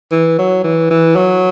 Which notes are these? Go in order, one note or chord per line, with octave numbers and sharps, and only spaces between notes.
E3
F#3
E3
E3
F#3